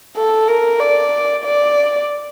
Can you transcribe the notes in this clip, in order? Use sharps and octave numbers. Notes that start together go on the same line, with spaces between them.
A4
A#4
D5
D5